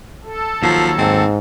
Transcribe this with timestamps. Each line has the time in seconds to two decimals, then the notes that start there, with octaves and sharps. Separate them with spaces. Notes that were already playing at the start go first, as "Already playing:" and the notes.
0.24 A4
0.63 D#2 F3 F#3
0.98 G#2 C4